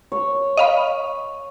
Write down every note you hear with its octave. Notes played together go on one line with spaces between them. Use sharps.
C#5
D#5 F5 B5